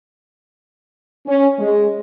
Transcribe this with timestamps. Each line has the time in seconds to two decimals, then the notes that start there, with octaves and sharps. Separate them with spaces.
1.27 C#4
1.59 G#3